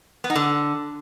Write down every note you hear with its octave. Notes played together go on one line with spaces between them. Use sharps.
B3
D#4
D3